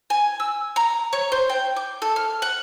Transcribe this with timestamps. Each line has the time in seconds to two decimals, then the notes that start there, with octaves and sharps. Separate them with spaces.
0.10 G#5
0.40 E6
0.76 A#5
1.13 C#5
1.32 C5
1.49 G5
1.76 D6
2.02 A4
2.16 F6
2.42 F#5